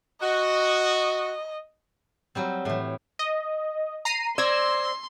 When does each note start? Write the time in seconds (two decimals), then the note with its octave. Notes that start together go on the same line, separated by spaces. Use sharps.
0.22 F#4 D#5
2.35 F#3 G3 C4
2.65 A2 E3
3.19 D#5
4.05 A#5 C7 D#7
4.38 C5 D5 C6 E6 G#6 A#6